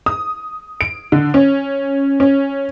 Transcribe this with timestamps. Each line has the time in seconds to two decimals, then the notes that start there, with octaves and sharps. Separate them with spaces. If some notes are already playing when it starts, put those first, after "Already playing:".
0.06 D#6
0.81 D7
1.12 D3
1.34 C#4
2.20 C#4